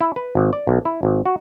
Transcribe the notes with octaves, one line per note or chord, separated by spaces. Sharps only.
E4
B4
G#1
D5
B1
E4
G#1
F#4